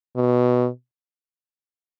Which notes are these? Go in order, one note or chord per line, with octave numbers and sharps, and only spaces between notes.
B2